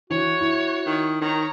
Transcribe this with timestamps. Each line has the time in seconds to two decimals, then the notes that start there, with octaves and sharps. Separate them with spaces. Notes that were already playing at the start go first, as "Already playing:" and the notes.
0.10 E3 F#4 C#5
0.41 E4
0.86 D#3
1.21 D#3 C#5 A#5